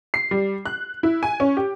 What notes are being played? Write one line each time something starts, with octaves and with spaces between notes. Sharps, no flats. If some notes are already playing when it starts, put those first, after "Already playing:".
C7
G3
F#6
E4
G#5
C#4
G4